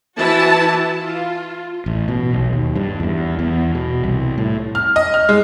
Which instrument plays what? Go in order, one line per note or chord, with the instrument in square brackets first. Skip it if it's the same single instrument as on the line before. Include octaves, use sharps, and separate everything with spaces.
[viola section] E3 E4 F#4 A5
F4
[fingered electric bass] A1
B2
B1
D#2
G2
E2
E2
B2
C2
A2
[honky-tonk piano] F6
D#5
F6
G#3